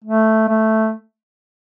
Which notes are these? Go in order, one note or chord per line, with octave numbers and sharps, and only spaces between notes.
A3
A3